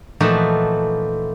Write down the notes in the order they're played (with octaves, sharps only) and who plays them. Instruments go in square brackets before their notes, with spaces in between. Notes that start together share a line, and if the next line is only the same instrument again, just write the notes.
[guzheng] A#2 E3 F3 A3 D#4 F#4